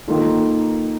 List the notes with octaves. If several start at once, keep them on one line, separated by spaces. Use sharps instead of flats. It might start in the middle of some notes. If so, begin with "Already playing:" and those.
D#3 A#3 F4 A4